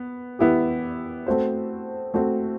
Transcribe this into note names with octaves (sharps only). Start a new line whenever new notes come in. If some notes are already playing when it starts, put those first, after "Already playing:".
Already playing: B3
E3 B3 E4 G4
A3 C4 F#4 C5
A3 C4 F#4 C5